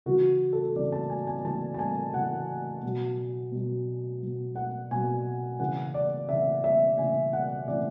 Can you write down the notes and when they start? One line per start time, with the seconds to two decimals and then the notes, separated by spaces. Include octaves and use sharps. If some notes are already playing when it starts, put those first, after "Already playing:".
0.06 C#3 F#4
0.09 E3
0.53 A4
0.76 C#3 E3 D5
0.92 A5
1.10 G#5
1.27 G#5
1.44 C#3 E3 A5
1.74 A5
1.79 G#5
2.14 C#3 E3 F#5
2.83 B2 F#3
3.52 B2 F#3
4.22 B2 F#3
4.55 F#5
4.91 B2 F#3 G#5
5.60 C#3 E3 F#5
5.94 D5
6.29 C#3 E3 E5
6.64 E5
6.98 C#3 E3 G#5
7.33 F#5
7.68 C#3 E3 D5